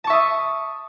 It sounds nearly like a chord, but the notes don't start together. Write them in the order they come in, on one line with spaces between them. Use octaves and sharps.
A5 C#6 E5 D#6